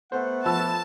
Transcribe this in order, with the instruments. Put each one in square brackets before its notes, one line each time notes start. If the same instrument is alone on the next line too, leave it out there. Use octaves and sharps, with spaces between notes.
[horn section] A3 B3 F#5 [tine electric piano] C5 E5
[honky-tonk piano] F3 B5 E6 [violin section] A5